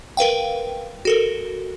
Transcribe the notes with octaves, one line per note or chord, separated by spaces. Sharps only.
A#4 B4 F5 G5
F#4 A4 A#4